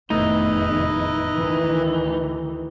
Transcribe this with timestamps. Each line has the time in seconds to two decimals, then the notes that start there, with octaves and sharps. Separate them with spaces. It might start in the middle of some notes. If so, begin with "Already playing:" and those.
0.10 F1 E2 A2 D#3 D#4 E4 B4 D#5
1.35 D2 D#3 E3